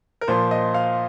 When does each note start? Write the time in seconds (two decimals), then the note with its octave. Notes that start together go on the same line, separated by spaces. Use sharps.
0.21 A#4
0.28 A#2 F3 C5
0.51 D#5
0.74 F5